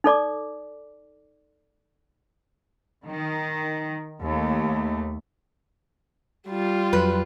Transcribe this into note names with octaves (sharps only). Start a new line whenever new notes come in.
D#4 A4 D5 D6
D#3
D#2 A3
G3 F4
F2 F#3 B4